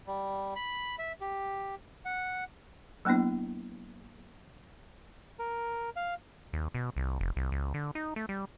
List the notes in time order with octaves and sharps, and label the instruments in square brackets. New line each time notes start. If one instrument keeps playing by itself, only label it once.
[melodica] G3
B5
E5
G4
F#5
[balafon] F#3 A#3 B3 D4 E4
[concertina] A#4
F5
[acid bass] D#2
B2
C2
F1
C2
C#2
D3
D#4
A3
G3